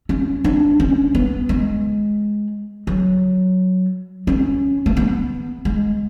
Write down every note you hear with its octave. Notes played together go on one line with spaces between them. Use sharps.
C#4
D4
C#4
B3
G#3
F#3
C#4
A3
B3
G#3